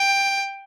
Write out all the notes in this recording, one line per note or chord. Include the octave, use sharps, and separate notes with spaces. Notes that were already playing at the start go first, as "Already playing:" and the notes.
Already playing: G5